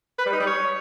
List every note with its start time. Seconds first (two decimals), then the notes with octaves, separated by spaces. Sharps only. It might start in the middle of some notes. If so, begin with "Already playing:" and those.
0.19 B4
0.26 G3
0.33 D#4
0.40 G3
0.47 C#5